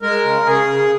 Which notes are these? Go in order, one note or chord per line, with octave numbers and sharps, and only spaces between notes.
G#3 A#4
C#3
C#3 G#4
C#3